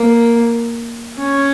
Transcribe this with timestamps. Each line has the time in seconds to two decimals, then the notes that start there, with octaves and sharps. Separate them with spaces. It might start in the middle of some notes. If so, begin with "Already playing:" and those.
Already playing: A#3
1.18 C#4